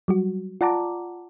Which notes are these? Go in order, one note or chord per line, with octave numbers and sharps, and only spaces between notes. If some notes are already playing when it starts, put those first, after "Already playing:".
F#3 G3 F#4
F4 D5 F#5 A5 A#5 D6